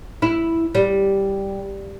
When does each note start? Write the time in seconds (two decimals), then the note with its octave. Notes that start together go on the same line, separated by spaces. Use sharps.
0.22 E4
0.75 G3